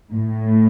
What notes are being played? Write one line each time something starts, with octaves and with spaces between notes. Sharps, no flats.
A2